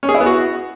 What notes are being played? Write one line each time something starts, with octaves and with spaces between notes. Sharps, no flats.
C#4
G#4
E4
B3
F#4